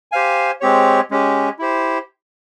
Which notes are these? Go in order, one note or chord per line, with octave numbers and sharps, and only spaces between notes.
G4 C5 F5 G#5
G#3 C4 G4 C#5
G#3 C#4 G4
E4 G4 C5